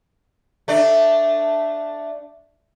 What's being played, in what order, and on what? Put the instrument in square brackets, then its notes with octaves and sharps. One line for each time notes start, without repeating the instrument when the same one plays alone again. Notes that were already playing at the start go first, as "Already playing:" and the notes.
[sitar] A3 D4